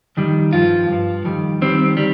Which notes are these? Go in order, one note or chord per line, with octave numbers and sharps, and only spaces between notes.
F2 D#3 G3
G2 F3 F4
G2 F3
F2 D#3 G3
F2 D#3 G3 C4
D#3 G3